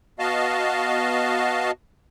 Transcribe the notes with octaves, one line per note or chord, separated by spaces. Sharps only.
B3 F#4 D#5 F5 A5